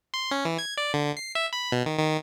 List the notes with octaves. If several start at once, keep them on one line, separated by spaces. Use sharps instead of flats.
C6
C#4
E3
G#6
D5
D3
C7
E5
B5
B2
D#3
D#3